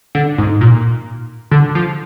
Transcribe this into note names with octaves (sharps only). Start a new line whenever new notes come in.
D3
G#2
A#2
D3
F3